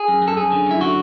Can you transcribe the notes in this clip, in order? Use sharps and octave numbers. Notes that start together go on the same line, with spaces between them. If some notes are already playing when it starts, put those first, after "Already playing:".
Already playing: G#4
F#2
F#2
A4
F#2 G#4
D3
F#2 E4
D3 F#4